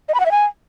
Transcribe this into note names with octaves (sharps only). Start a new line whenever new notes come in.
D#5
B5
F#5
E5
G#5